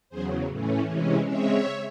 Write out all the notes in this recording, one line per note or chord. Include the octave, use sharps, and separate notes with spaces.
E2 C#3 F#3 G#4 C5
A2 E3 A3 C#4
C3 E3 G#3 C#4
C#3 G#3 C4 C#5 E5